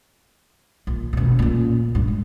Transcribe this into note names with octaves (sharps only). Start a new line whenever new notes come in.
A#1
F#1 B2
A#2 C#3
G2
G#2